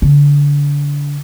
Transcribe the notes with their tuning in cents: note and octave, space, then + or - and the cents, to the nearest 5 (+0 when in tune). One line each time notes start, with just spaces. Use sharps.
D3 -30